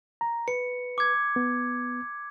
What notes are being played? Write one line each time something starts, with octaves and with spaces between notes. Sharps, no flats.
A#5
B4 C#7
D6 G#6
B3